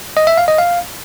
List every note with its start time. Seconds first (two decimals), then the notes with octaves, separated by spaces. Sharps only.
0.17 D#5
0.27 E5
0.37 F5
0.48 D#5
0.58 F5